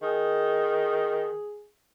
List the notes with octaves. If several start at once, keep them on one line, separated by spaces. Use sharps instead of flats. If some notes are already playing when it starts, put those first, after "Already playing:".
D#3 G#4